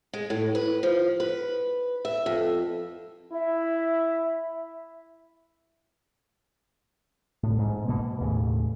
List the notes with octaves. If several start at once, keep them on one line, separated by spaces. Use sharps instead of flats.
G#3
A2
B4
F3
B4
E5
F2
E4 E5
A2
G#2
B2 A#3
D#2 A2 C#3